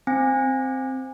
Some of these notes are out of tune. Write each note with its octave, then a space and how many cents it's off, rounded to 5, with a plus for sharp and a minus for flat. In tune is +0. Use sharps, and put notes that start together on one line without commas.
C4 +0 G#5 -25